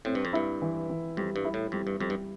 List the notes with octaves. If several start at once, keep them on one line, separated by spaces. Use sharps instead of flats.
A2 C4
G2
F2
G2 E4
E3
E3
F2 G3
G2
E4
A2
F2 G3
G2
F2 G3
G2